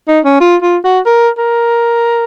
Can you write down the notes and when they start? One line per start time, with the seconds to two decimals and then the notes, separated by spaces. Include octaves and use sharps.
0.08 D#4
0.25 C#4
0.41 F4
0.62 F4
0.84 F#4
1.06 A#4
1.38 A#4